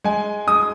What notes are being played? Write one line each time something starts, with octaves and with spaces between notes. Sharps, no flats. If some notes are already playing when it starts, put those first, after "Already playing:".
G#3 G#5
G#3 D#6